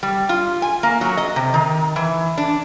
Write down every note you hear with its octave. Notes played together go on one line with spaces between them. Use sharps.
G3
F4
G#5
A#3
F#3
D#5
C3
D#3
E3
D4